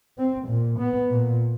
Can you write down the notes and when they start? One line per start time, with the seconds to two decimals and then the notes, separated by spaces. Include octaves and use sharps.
0.18 C4
0.49 A#2
0.80 B3
1.11 A#2